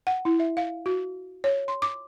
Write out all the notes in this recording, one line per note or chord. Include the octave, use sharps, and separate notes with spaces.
F#5
E4
E5
F5
F#4
C#5
C6
D6